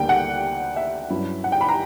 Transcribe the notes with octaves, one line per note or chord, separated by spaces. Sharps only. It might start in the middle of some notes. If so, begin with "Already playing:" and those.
Already playing: D2 D3 G3 A#3 G5
F#5
E5
G2 F#3 C#4 E4
F#5
G5
B5
A#5